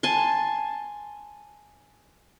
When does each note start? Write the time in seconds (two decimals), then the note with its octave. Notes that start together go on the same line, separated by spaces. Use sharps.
0.03 G#5 A5 C6